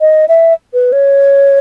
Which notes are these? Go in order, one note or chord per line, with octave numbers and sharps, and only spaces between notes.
D#5
E5
B4
C#5